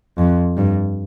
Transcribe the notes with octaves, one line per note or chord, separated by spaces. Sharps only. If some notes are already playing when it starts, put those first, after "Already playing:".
F2
G2